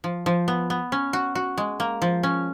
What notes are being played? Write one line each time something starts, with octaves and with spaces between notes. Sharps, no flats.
F3
F3
B3
B3
C#4
F#4
F#4
G#3
A#3
F3
C#4